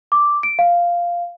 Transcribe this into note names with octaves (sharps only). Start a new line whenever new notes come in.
D6
D7
F5